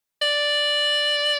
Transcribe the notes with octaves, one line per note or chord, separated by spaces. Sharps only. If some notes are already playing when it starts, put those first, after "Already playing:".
D5